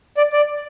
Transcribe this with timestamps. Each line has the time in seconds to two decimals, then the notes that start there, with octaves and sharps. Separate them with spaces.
0.17 D5
0.32 D5